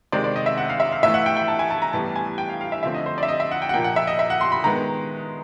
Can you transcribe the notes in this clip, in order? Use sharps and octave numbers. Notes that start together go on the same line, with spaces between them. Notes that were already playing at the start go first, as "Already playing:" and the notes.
C3 D#3 G#3 C4 D5
D5
D#5
E5
F#5
F5
E5
F5
A2 E3 A3 E5
F#5
G5
G5
A5
G#5
A5
A#5
A2 E3 G3 B3 A5
G#5
G5
F5
F5
E5
D3 F3 A3 C4 E5
D#5
C5
D5 E5
D#5
E5
F#5
G5
F#5
A#2 F3 A#3 G5
F#5
E5
D#5
E5
F#5
C6
B5
D#3 G#3 B3 A#5